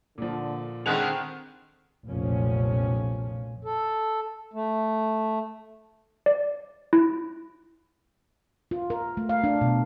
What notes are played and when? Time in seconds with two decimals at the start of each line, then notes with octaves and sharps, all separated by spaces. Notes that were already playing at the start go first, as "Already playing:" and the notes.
0.18 A#2 D3 F3
0.86 D3 D#3 G#3 B3 C4 F#6 F7
2.07 F1 B1 A#2 F3 C#4
3.63 A4
4.53 A3
6.26 D5
6.93 E4
8.71 F4
8.90 A#4
9.17 A3
9.29 F5
9.44 D4
9.61 B2